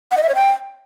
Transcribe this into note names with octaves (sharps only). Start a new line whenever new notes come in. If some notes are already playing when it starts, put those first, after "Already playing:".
F#5
D#5
E5
C#5
G5